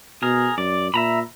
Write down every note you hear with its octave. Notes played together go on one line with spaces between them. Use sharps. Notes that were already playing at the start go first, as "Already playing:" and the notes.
B2 G#4 A#4
F#2 D5
A#2 E5 A#5 B5